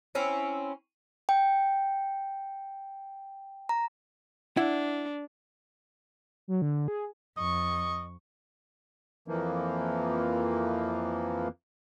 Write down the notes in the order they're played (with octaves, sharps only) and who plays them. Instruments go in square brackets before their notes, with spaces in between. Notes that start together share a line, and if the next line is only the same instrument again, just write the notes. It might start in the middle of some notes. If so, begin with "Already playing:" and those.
[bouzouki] C4 C#4 E4
[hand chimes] G5
A#5
[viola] D4 [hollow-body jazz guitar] E4 F#5
[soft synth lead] F#3
D3
G#4
[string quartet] F2 C#6 [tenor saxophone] D#5
[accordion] F2 E3 F3 A#3